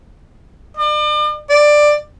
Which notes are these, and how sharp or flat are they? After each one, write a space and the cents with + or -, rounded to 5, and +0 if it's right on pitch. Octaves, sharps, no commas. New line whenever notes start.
D5 +40
D5 +10